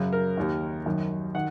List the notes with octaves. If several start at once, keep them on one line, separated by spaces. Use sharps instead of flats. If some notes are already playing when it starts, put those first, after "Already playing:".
Already playing: F#2 C#3
A#4
D#2 D#3
F#2 D#3
D#3 F#5